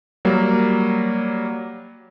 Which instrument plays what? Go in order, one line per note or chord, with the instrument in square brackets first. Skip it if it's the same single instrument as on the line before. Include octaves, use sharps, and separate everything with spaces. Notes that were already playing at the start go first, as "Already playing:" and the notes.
[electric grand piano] F#3 G3 A#3